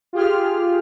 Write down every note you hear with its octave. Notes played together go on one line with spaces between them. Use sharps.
F4 G4 G#4 F6